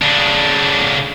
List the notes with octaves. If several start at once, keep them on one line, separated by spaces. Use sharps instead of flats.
C#3 D4